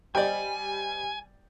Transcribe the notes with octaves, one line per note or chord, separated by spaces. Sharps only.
G3 C5 D5 D#5 G5 G#5 G6